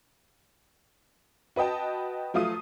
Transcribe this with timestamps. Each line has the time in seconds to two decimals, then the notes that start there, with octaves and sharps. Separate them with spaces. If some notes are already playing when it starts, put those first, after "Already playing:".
1.56 F#4 B4 D#5 G5 A5
2.34 F3 F#3 A3 F4 D#6 D#7